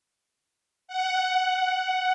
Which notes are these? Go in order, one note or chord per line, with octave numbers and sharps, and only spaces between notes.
F#5